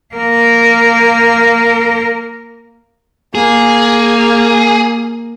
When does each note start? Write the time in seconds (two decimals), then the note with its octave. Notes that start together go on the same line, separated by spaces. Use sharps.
0.15 A#3 A#4
3.35 A#3 G#4